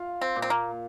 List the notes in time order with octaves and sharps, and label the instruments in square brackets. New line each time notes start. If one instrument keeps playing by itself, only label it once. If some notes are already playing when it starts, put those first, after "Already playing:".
Already playing: [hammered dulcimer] F4
[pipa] C4
[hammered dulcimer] A#2
[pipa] C4
A#3